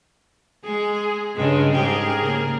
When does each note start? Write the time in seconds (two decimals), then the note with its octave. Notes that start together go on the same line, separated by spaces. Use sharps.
0.64 G#3 G#4
1.36 G2 C#3 G#3
1.73 G#2 G4 G#4 A#4
2.21 C#3 A#3